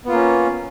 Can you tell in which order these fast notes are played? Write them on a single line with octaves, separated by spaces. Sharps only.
B3 F4 A#3 C#4